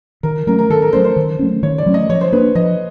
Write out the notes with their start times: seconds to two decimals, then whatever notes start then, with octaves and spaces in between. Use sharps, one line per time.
0.23 D#3 A#4
0.47 F#3 A3 C#4 A#4
0.59 A#4
0.70 D#3 A4
0.82 A#4
0.93 F#3 A3 C#4 C5
1.05 C5
1.16 D#3
1.39 F#3 A3 C#4
1.63 D#3 C#5
1.78 D5
1.86 F#3 A3 C#4
1.94 D#5
2.09 F3 C#5
2.21 C5
2.32 A#3 D4 B4
2.55 F3 D#5